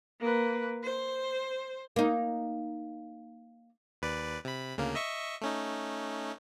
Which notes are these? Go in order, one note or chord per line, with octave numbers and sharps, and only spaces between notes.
A#3 B4
C5
A#3 D#4
D#2 B4 D5
C3 B5
D2 C#3 A#3
D#5 E5 C#6
A3 C#4 D#4